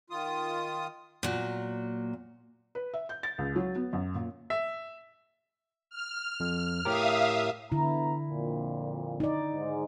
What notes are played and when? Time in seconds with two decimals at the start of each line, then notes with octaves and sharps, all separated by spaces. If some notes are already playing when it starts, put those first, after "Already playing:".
0.10 D#3 F4 D#6
1.23 A#2 F#3
2.75 B4
2.94 E5
3.09 G6
3.23 A6
3.38 C#2
3.56 F#3
3.76 B3
3.93 F#2
4.15 A#2
4.50 E5
5.90 F6
6.40 F2
6.85 A2 G4 A#4 E5 F5 D#6
7.72 D3 B3 E4 E5 A#5
8.29 F2 A#2
9.20 D#4 D5
9.54 G#2